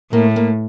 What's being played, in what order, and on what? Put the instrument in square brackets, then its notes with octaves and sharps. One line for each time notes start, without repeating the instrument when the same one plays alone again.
[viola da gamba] A2 [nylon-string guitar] A#3
[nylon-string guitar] A#3